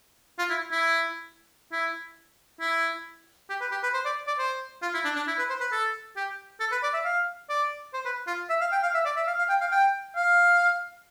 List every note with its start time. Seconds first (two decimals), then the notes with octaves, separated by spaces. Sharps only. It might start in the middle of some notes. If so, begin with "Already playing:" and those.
0.39 F4
0.50 E4
0.72 E4
1.72 E4
2.60 E4
3.49 G4
3.61 B4
3.71 G4
3.83 B4
3.94 C5
4.05 D5
4.27 D5
4.39 C5
4.82 F4
4.94 E4
5.04 D4
5.16 D4
5.27 E4
5.39 B4
5.50 C5
5.60 B4
5.72 A4
6.17 G4
6.60 A4
6.72 B4
6.83 D5
6.94 E5
7.05 F5
7.49 D5
7.94 C5
8.05 B4
8.27 F4
8.50 E5
8.61 F5
8.72 G5
8.83 F5
8.94 E5
9.05 D5
9.16 E5
9.27 F5
9.38 F5
9.49 G5
9.61 F5
9.72 G5
10.16 F5